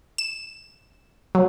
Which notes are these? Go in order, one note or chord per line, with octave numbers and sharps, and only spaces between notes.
E7
F#3